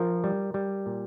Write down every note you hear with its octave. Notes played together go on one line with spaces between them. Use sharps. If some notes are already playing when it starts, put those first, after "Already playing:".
Already playing: F3 A#4
G3
G3
A#2